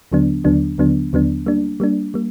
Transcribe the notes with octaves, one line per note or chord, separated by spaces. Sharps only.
D#2 D3 F#3 B3 D4
D#2 D3 F#3 B3 D4
D#2 D3 F#3 B3 D4
D#2 D3 F#3 B3 D4
G3 A#3 D4
G3 A#3 D4
G3 A#3